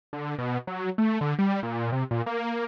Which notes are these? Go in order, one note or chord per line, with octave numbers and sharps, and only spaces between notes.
D3
B2
F#3
A3
D3
G3
A#2
C3
A#2
A#3